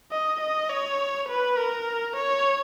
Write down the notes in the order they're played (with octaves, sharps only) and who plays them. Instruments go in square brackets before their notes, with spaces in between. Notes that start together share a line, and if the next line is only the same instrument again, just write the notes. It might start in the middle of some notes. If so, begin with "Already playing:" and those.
[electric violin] D#5
D#5
C#5
B4
A#4
C#5